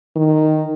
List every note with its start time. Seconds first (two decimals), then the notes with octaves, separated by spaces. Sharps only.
0.16 D#3